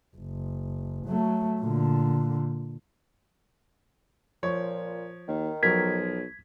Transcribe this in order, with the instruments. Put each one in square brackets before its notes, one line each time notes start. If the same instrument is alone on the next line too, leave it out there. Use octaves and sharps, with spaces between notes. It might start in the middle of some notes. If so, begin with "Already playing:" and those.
[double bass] F#1
F#3 A3
A#2 D3
[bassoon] A#2 [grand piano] F3 C#5
[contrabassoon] D#2 [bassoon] D#3
[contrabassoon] B1 [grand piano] F3 F#3 A#4 [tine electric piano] G#6 B6